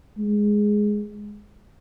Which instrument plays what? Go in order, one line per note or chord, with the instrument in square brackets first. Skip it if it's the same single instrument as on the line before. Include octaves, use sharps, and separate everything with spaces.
[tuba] G#3